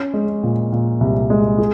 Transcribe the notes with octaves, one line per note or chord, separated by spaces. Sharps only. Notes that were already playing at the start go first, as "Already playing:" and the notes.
Already playing: C#4
G#3
A#2
A#2
C2
G#3
G#4